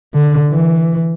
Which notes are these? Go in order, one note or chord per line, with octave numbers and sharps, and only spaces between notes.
D3
E3